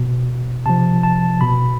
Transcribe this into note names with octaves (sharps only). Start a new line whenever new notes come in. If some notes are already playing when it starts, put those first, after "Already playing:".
Already playing: B2
C3 F3 A5
A5
B2 B5